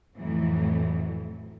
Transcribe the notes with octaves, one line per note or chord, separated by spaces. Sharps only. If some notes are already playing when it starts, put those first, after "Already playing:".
F2 A2 E3 F#3